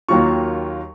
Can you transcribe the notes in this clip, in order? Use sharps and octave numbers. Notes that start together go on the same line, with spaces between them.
D#2 D#3 F#3 A#3 F4 C#6